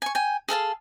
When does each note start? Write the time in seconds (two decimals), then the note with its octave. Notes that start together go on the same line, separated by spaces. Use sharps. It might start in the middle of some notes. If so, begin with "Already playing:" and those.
0.02 G#5 C#6
0.15 G5 G#5
0.48 G#4 A4 F5 A5